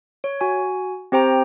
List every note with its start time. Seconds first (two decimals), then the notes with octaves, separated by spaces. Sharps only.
0.24 C#5
0.41 F#4 G#5
1.12 C4 G4 C5 G5 A#5